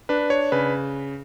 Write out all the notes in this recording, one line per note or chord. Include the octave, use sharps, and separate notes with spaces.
D4 B4
C#5
C#3 B4